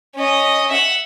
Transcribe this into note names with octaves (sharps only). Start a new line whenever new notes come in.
C#4 D#5
E5 F#5